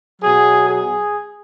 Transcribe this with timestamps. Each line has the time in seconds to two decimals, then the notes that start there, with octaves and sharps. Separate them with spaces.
0.22 B2 F#3 G#4
0.69 G#4